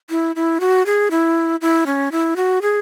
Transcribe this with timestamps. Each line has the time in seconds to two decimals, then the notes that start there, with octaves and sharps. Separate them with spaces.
0.10 E4
0.36 E4
0.60 F#4
0.86 G#4
1.11 E4
1.61 E4
1.86 C#4
2.12 E4
2.36 F#4
2.62 G#4